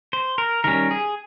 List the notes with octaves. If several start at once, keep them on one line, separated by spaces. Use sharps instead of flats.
C5
A#4
D#3 G3 C#4 A#4
G#4